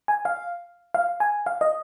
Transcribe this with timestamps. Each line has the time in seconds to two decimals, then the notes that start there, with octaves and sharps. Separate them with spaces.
0.08 G#5
0.25 F5
0.94 F5
1.20 G#5
1.46 F5
1.61 D#5